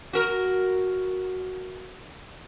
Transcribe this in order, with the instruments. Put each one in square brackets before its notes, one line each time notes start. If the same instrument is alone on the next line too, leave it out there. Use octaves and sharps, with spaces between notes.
[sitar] F#4 A#4